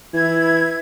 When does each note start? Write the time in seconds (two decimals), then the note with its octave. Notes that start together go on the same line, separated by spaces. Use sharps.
0.14 E3 E4 G#6